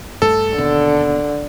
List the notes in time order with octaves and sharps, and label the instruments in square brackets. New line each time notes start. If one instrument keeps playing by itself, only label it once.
[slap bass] G2 A3 [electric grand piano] A4
[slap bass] D#2 B2 [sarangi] D3